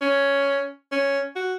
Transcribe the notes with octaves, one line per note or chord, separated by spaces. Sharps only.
C#4
C#4
F#4